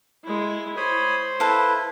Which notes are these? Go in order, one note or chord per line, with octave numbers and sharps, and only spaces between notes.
G#3 E4
C5 C#5 B5 D#6
E4 A4 B4 F5